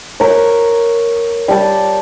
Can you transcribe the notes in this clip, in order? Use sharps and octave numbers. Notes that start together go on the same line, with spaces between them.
A#4 C#5
G3 A5